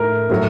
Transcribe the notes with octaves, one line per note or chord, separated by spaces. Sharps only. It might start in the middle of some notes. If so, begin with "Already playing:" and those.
Already playing: A2 A#4
A2 F#3